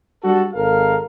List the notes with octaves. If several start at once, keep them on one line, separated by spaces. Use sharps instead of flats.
G3 D4 F#4 A4
G#1 A4 A#4 F5